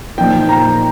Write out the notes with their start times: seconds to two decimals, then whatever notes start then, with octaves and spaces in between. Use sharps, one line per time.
0.18 A#2 F3 D#4 G5
0.49 A#5